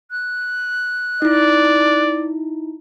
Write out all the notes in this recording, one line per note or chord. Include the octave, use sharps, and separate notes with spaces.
F#6
D#4 E4 D5